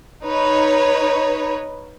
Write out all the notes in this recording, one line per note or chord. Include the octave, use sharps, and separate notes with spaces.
D#4 B4 C#5